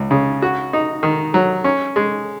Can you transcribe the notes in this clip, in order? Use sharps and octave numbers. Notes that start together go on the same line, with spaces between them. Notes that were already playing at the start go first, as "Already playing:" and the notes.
Already playing: C#2
C#3
F#4
D#4
D#3
F#3
C#4
G#3